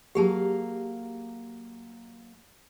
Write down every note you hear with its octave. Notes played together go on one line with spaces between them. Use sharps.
F#3 A#3 G4 G#4 F5 A5